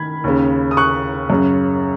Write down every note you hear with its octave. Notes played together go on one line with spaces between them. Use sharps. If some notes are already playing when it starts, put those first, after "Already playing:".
Already playing: D#3 B5 G#6
D#2 C#3
D#6
C#6 F#6
F#2 C#3